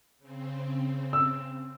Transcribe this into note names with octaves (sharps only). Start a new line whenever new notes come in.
C#3 C4
E6